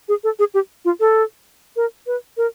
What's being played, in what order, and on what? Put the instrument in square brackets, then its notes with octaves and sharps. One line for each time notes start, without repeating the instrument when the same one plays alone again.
[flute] G#4
A4
G#4
G4
F4
A4
A#4
B4
A#4